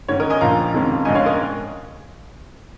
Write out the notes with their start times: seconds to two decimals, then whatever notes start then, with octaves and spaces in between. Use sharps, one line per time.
0.08 G#2 D#3 C#4 C#5
0.20 A#4 D#5
0.30 D#5 G#5
0.41 A#1 A#2 F3 F5 A#5
0.73 F1 F2 D#3 G#3 C#4
1.05 A#1 G#2 G#3 C#4 D#5 G#5
1.15 C#5 F5
1.26 A#4 D#5